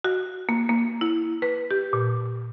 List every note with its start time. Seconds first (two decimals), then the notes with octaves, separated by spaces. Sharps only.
0.04 F#4
0.49 A#3
0.69 A#3
1.01 E4
1.42 B4
1.71 G4
1.93 A#2